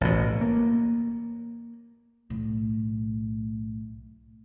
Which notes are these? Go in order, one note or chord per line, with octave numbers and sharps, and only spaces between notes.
A1 B2
A#3
B1 A2